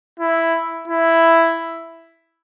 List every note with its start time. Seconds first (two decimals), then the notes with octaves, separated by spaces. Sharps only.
0.20 E4
0.88 E4